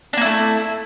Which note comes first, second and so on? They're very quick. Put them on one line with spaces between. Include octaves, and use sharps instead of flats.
D4 A#3 E4 A3